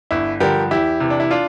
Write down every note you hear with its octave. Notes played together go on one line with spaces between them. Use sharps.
G1 E4
G2 D3 F3 G4 A#4
E2 E4 G4
C3 E3
D4
E4
D4 F4